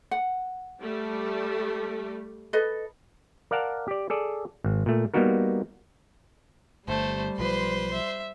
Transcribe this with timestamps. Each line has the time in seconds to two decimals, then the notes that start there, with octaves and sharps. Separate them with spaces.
0.11 F#5
0.80 G3 A3
2.53 A4 B4 D#5
3.51 A#4 D5 F5 F#5 A5 A#5
3.88 G4 D5
4.10 G#4 A4 D5
4.64 G#1
4.86 A#2 A3
5.14 G3 A#3 B3 D#4 F#4 A#4
6.88 G1 G3 A3 C5
7.39 B1 F3 B4 C5 C6
7.93 E5